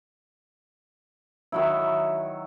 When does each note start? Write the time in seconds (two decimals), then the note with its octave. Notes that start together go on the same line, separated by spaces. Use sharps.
1.52 D#3 F#3 E4